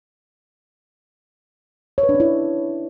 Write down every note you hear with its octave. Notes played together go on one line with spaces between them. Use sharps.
C#5
B4
D4
C#4
E4